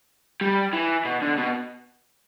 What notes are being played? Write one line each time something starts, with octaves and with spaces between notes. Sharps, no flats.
G3
E3
B2
D3
B2